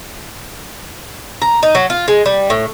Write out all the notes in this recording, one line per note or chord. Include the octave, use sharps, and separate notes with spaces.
A#5
D#4
F#3
F4
G#3
G3
A2